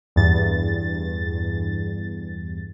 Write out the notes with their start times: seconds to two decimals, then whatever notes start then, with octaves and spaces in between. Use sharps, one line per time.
0.16 E2 G2 A6